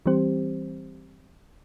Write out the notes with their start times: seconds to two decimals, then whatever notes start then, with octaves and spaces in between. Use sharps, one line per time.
0.06 E3 G3 C4 G4 C5